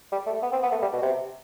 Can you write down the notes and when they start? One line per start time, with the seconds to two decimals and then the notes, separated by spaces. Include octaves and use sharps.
0.12 G3
0.26 A3
0.42 B3
0.52 C4
0.63 B3
0.72 A3
0.82 G3
0.93 B2
1.02 C3